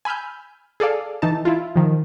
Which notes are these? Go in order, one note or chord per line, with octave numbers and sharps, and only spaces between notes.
G#5 B5 E6 F6 G6
G#4 A4 D5 F5
E3 D#4 A5
E4 F4
D#3 F3